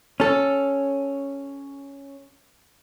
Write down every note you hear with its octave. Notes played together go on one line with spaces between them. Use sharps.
C#4 A4